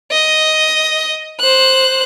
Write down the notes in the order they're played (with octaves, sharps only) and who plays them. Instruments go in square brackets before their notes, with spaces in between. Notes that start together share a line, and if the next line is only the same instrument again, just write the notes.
[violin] D#5
C5 F#6